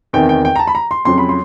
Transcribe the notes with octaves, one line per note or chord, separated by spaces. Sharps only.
E2 C3 D#3 G5
G5
G5
A#5
A5
B5
A#5
C6
F2 C#3 F#3 C6
B5
C6